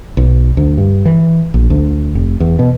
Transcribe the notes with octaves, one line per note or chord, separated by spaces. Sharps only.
B1
D2
G2
E3
A#1
D2
F1
E2
B2